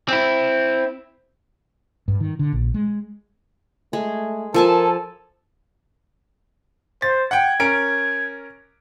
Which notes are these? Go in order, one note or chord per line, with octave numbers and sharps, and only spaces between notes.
C4 E4
G2
D#3
D3
A#1
G#3
G#3 A3
F3 A4 A#4 G#5 A5
C5 A6
F#5 G5 G#6
C#4 A#4 D7